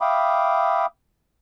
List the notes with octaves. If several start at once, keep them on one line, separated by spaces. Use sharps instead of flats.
E5 F5 G5 B5 D6 D#6